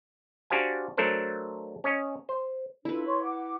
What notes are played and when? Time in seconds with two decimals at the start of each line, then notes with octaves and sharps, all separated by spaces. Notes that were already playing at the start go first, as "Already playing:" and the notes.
0.50 D4 F#4 G4 C5 F5 G#5
0.97 F#3 A3 D4 A4 A#4 C5
1.84 C#4 C#5 D#5
2.29 C5
2.85 D4 E4 F4 A4 B4
3.07 C#5 C6 C#6
3.23 F#5 D6